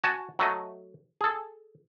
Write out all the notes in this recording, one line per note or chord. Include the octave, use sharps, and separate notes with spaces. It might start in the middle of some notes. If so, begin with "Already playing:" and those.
F#4 G#5 A5
F#3 A3 D#5
G#4 A4